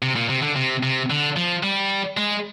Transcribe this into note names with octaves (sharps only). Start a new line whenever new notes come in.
C3
A#2
C3
D3
C3
C3
D3
F3
G3
G#3